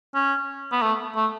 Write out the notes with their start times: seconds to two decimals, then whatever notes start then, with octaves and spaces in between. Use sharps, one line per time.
0.14 C#4
0.72 B3
0.82 A3
1.16 A3